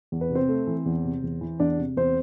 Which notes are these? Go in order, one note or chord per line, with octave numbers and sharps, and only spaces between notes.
E2
B4
C3
C4 C5
A3
E3
E2
C3
E2
E3
E2 D4 D5
C3
E2 C4 C5